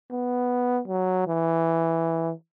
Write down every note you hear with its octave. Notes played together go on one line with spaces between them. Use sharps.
B3
F#3
E3